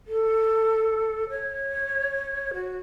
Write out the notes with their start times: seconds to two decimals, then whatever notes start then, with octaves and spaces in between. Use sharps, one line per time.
0.07 A4
1.29 C#5
2.53 F#4